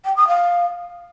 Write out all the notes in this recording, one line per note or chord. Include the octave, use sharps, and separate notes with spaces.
G5
D#6
F5